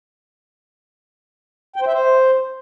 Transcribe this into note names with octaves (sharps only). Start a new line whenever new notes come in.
G5
C5
E5
C5